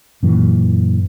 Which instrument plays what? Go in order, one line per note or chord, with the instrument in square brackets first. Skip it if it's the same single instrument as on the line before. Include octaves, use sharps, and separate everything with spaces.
[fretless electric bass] F#2 A#2 E3